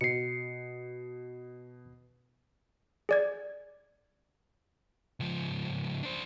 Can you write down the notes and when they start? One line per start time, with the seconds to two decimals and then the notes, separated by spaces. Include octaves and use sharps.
0.01 B2 C7 C#7
3.09 G#4 D5 G#6
5.20 C#2 F3
6.03 D4 C5